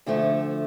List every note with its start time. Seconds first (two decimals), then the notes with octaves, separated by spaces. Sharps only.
0.06 D2 D3 F3 A3